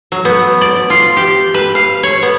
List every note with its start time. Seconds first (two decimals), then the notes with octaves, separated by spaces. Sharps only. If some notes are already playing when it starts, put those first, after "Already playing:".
0.12 F#3
0.25 B3
0.61 D5
0.90 F4
1.17 G4
1.54 B4
1.75 F5
2.03 C#5
2.23 B3